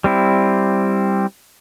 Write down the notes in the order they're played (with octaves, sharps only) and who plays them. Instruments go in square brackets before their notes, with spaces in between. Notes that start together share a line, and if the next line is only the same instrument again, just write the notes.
[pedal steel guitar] G3 C4 E4